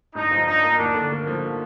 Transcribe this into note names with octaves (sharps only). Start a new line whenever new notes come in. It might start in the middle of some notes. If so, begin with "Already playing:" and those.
G2 D#4
F3
D4 D#4
A#3
D#2 D4
D3
A#3
F3